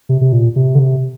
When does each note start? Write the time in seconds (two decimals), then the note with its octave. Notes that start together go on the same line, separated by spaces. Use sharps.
0.09 C3
0.21 C3
0.32 A#2
0.56 C3
0.75 D3
0.79 C3